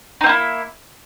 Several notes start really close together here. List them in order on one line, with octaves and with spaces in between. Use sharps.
D#4 C4 A#3 E4